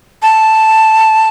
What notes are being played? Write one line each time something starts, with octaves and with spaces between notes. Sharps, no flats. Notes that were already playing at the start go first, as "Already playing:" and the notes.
A5